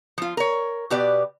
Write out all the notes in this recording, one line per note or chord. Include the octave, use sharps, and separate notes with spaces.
F3 F4
A#4 C#5
B2 G4 B4 D5